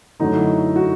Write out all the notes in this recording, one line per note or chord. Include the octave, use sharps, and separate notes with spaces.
F#2 D3 F#3 A3 D#4
E4
F#4